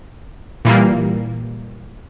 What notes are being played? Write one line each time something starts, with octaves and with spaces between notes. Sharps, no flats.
A#2 E3 G3 A#3